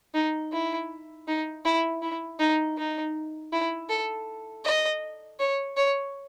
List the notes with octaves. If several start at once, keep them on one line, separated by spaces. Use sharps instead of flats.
D#4
E4
D#4
E4
E4
D#4
D#4
E4
A4
D#5
C#5
C#5